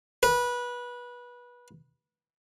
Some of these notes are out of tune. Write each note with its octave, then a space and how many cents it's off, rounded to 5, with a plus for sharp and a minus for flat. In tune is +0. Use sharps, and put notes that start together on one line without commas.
B4 -20